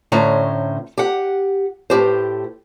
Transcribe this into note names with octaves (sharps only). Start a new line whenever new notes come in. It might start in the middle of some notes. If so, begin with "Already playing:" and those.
A2 D3 C#4 C5 A#5
G4 F#5
A2 G4 C5